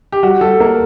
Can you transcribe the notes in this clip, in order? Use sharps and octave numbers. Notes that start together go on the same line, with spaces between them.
G4
G3 F#4
G3 A4
A#3 A#4